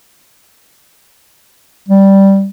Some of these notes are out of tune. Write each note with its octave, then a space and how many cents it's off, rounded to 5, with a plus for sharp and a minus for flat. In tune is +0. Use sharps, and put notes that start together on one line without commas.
G3 -5